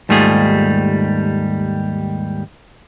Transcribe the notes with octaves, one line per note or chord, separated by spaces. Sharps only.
D#2 G#2 G3 A3 F4 G#4